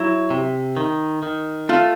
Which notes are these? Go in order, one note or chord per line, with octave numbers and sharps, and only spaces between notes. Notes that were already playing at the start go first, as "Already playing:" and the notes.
Already playing: F#3 E4
C3
D#3
D#3
A3 F4